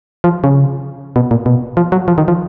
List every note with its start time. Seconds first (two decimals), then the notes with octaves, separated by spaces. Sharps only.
0.24 F3
0.44 C#3
1.16 B2
1.31 A#2
1.46 B2
1.77 F3
1.92 F#3
2.08 F3
2.18 D#3
2.28 F3